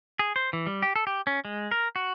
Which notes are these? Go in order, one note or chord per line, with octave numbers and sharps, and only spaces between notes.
G#4
C5
E3
G3
G4
A4
G4
C#4
G#3
A#4
F#4